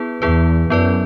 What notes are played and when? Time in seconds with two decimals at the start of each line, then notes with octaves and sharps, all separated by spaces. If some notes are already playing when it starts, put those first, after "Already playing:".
Already playing: B3 E4 G#4 B4
0.22 E2 B3 E4 G#4 B4
0.70 F#2 B3 E4 B4 D5